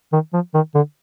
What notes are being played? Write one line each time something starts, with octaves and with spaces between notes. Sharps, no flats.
D#3
F3
D#3
D3